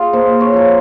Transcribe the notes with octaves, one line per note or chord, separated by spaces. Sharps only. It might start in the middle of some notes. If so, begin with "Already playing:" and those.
Already playing: F4 G#4
A#3 C5
C#5
F3 A#4